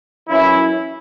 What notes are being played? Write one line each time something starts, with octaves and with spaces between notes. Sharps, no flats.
F#2 E3 C#4 E4